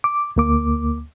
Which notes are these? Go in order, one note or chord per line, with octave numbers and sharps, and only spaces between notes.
D6
D2 A#3 D6